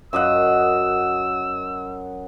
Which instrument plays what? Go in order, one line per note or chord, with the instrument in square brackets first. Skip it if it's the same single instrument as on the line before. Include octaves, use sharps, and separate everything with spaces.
[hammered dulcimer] F#2 D#5 F#5 [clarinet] E6